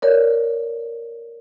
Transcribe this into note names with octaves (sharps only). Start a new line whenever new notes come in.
A#4 C#5 D5